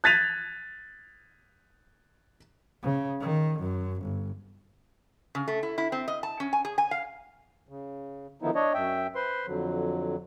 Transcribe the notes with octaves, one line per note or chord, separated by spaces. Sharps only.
F#6 G#6 A6 B6 D#7 F7
C#3
D#3
F#2
G1
C#3
A3
E4
E4
C4
D#5
A5
C#4
G#5
G#4
G#5
F5
C#3
D3 D#3 F3 B3 D#4 E4
D4 C#5 D#5
F#2 E5 G5
B4 C5 C6
F2 D3 F#3